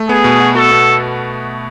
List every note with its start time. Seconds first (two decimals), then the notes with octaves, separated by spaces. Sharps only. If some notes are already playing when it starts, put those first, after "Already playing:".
Already playing: A3
0.09 B3 G#4
0.24 B2
0.40 F#4
0.55 F#4 A4
0.71 B2